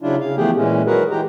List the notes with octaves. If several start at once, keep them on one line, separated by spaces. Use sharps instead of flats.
C#3 F#3 D4 E4 F4
C#3 F5
E3 F3 A3 B3 G4 G#4
A#2 E3 G#3 C#4
D#3 F#3 F#4 G#4 A#4 B4
E3 G#3 G4 A#5